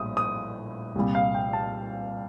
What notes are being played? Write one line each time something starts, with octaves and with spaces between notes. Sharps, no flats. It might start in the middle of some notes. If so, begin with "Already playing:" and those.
Already playing: A#1 A2 G3 D#6
D#6
C2 A#2 G3
F5
G5
A5